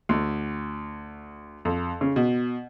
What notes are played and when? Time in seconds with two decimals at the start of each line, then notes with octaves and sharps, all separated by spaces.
0.09 D2
1.65 F2
2.01 C#3
2.16 B2